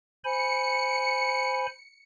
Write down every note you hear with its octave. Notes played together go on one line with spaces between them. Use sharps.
C5 G#5 B5 C#7